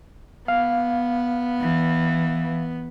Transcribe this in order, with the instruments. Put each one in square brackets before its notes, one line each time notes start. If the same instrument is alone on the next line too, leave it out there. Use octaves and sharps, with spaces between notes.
[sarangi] B3 [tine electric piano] F5
[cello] E3